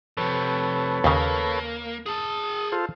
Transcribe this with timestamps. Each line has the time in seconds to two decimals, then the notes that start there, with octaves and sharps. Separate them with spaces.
0.17 F2 C3 A4 B4 C#5
1.04 D#2 C#3 A#3
2.06 G#4 A5 D#6
2.72 F4 A4 C5